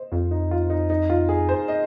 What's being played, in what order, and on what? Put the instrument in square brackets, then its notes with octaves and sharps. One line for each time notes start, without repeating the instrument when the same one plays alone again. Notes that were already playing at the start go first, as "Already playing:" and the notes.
Already playing: [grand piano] C5 D#5
[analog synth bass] F2 [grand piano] F4
[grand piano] D#4
F4
D#4
D#4
F4
G#4
C5
D#5